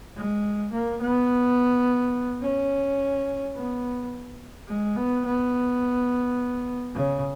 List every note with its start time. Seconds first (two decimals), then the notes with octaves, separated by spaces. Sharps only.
0.16 G#3
0.72 A#3
1.01 B3
2.42 C#4
3.55 B3
4.68 G#3
4.96 B3
5.25 B3
6.94 C#3